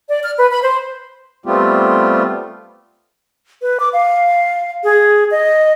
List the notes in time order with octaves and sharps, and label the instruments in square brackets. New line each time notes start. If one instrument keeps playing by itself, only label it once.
[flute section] D5
F6
B4
B5
C5
[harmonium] G3 A3 B3 C4 F4 G4
[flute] B4
D6
F5
G#4
D#5